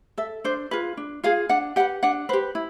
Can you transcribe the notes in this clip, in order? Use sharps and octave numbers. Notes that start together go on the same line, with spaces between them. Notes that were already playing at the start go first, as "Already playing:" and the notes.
A4 E5
D4 C5
F4 G#4 B4
D4
F4 G#4 F5
D4 F#5
G4 B4 F#5
D4 F#5
G4 B4 C5
E4